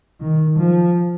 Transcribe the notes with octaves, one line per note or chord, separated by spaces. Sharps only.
D#3
F3